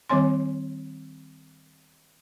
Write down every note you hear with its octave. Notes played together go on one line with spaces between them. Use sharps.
D#3 G3 C4 C#5 G#5 C6